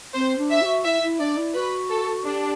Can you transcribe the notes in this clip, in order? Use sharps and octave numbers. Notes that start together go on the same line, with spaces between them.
C4 C5
D4
E5
G4
F#4
E4 E5
E4
D4 D5
E4
F#4 B4
A4
D4 G4